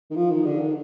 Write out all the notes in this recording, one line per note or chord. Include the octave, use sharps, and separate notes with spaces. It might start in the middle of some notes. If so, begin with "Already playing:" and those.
D#3
F3
D#3
D3
D#3